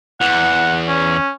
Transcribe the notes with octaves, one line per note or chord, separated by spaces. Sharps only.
E2 F#5
C#4